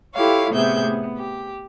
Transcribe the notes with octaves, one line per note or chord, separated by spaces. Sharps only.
E4 F4 G4 A4 C#5 F5
A2 C3 B3 G#4 E5 G6
B3
G4